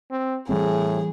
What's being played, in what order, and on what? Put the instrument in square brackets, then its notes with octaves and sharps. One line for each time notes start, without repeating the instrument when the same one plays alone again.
[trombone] C4
[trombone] A2 [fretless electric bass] E3 G3 C4 [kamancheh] G#4